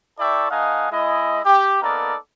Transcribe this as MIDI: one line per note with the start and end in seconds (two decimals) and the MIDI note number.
0.19 0.45 64
0.19 0.45 69
0.19 0.45 74
0.19 0.45 76
0.19 0.45 79
0.19 0.45 85
0.51 0.90 57
0.51 0.90 63
0.51 0.90 75
0.51 0.90 77
0.51 0.90 78
0.51 0.90 80
0.91 1.40 56
0.91 1.40 64
0.91 1.40 75
1.45 1.80 67
1.82 2.15 58
1.82 2.15 59
1.82 2.15 63
1.82 2.15 69
1.82 2.15 70
1.82 2.15 74